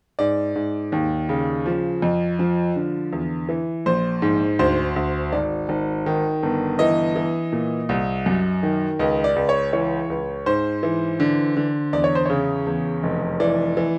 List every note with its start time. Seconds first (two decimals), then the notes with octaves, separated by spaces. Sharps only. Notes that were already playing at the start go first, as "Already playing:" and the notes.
0.19 G#2 D5
0.56 G#2
0.92 D#2
1.29 C#3
1.66 F3
2.02 F2
2.39 F3
2.76 D3
3.13 E2
3.49 E3
3.86 A#1 C5
4.22 G#2
4.59 D2 C5
4.96 D2
5.33 G#1 D5
5.69 G#1
6.06 D#3
6.43 G1
6.79 E3 D#5
7.16 E3
7.52 A#2
7.89 C2
8.26 F#2
8.63 D#3
8.99 C#2 D#5
9.24 D5
9.36 C#2
9.49 C#5
9.73 E3 C#5
10.10 C#2
10.46 G#2 C5
10.83 E3
11.20 D3
11.57 D3
11.93 E2 D5
12.04 C#5
12.15 C5
12.26 C#3 C#5
12.66 E2
13.03 F1
13.40 E3 D5
13.77 E3